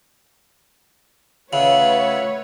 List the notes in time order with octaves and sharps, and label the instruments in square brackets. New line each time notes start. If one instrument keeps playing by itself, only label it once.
[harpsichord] C#3 [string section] A3 B4 C#5 [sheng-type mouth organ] F4 E5 F#5